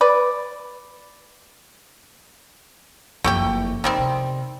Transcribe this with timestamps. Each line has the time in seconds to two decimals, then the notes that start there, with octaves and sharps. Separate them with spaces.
0.01 B4 D5
3.24 F#1 F2 A3 G4 G5
3.84 D3 D#3 G3 C4
3.98 C3